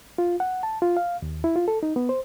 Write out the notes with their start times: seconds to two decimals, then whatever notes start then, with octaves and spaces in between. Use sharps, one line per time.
0.18 F4
0.40 F#5
0.63 A5
0.82 F4
0.97 F5
1.22 D#2
1.44 E4
1.56 F4
1.68 A4
1.83 D#4
1.96 B3
2.09 C5